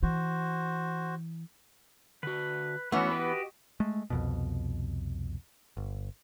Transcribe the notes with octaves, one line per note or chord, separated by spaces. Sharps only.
E3 F#4 C5
D3 F#4 B4
E3 A3 B3 C#4 F#4 F#5
F#4 G4 B4 D#5
G#3 A3
C2 F2 B2
G1